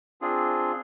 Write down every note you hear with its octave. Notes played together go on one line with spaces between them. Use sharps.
C4 D4 F4 G#4